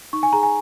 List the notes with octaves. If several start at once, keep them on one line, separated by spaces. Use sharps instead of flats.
D#4 C#6
G#5
G#4 A#5
G#5